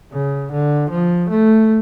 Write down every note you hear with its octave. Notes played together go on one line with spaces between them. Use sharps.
C#3
D3
F3
A3